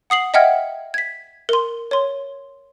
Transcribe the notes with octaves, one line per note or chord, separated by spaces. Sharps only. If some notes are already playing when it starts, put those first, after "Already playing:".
F#5 D#6 C7 F#7
D#5 E5 F#5 G5 F6 G#6
G#6 B6
A#4 C6
C#5 C6